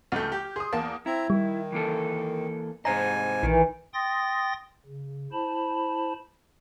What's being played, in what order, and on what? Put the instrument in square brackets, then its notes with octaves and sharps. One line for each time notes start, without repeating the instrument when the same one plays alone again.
[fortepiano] C#2 A3 [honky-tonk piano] F6 G6
[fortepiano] G4
[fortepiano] G#4 [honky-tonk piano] C6 D#6
[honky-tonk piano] E2 A#3 [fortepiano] A5
[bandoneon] C4 A#5 [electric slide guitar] E4
[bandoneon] D#3 [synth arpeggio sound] G3
[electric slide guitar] E3 A#3 A4
[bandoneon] G#2 G#5 [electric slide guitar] C3 C5 D#5 [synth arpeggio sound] A#5
[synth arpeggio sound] A#1 [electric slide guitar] D#3 [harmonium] E3
[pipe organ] G5 C6 D#6 A6 A#6
C#3
E4 C5 A5 B5